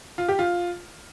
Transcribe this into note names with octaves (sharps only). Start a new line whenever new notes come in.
F4
G4
F4